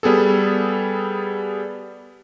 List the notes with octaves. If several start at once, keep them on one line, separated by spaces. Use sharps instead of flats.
G3 B3 G#4 A4